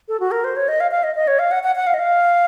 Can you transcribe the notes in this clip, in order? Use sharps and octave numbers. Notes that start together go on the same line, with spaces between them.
A4
F#4
A#4
C5
C#5
D#5
F5
F5
D#5
D#5
C#5
F5
F#5
F#5
F#5
F5
D#5
F5